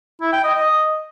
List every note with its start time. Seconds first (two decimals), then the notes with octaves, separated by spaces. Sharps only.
0.21 E4
0.33 G5
0.44 D#5
0.55 D#5